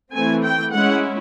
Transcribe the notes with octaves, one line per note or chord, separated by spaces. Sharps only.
E3 A3 C4 G#5
G5
G#3 C#4 E4 F#5